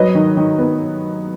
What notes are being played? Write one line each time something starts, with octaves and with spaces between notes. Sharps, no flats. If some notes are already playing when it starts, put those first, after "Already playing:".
Already playing: F#3 B4 D#5
D#3
D#3
B3